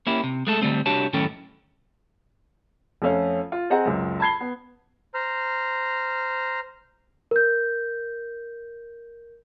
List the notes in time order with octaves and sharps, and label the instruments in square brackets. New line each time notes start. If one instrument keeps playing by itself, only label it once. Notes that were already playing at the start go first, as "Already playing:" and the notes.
[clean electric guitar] A#3 C#4 E4 G4
C3
G#3 A3 A4
D3 G3 A3 C4
C2 D4 F#4 G4 C#5 A5
F#2 A2 D#3 C#4 A4 G5
[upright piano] F2 A3 C#4 F5
F4
C4 G#4 D#5 F#5 A#5
C#2 F#2
A5 B5 G#6 C7 G7
B3
[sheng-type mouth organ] C5 A#5 F6
[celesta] A#4 G6